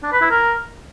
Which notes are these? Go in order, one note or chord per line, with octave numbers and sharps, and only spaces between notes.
D4
B4
E4
A#4